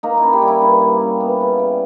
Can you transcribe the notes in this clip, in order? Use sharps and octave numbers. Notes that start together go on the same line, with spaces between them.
A#3 D#4
E4
C#4
G4
G3
E4
G2 E4
A#3
C#4
B3
C#3
G3